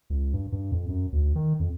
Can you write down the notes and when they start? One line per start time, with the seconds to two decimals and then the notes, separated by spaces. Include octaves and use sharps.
0.10 C#2
0.33 G2
0.52 G2
0.72 F2
0.88 F#2
1.12 D2
1.35 D#3
1.60 F2